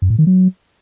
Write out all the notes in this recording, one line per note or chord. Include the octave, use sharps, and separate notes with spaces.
F#2
A2
D#3
F#3